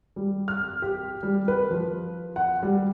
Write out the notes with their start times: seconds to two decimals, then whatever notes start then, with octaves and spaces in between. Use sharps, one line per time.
0.16 G3
0.48 F6
0.82 G4
1.23 G3
1.48 B4
1.70 F3
2.36 F#5
2.63 G3